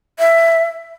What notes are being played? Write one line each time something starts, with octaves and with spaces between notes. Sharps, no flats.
E5